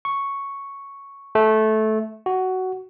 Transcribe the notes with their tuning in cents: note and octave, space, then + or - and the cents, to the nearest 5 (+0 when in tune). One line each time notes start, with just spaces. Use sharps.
C#6 +0
A3 -15
F#4 +10